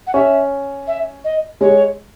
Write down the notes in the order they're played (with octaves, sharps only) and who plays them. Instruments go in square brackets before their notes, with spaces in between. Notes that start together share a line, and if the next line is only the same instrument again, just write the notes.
[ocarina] F#5
[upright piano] C#4 [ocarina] E5
[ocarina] E5
D#5
[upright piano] G#3 [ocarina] C#5